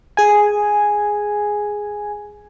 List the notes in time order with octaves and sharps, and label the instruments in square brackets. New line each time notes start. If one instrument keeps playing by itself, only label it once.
[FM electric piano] G#4 G#5